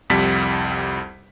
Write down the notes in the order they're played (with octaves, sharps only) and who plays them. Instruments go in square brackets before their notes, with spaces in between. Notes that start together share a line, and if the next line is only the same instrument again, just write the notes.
[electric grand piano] C2 F2 G3 B6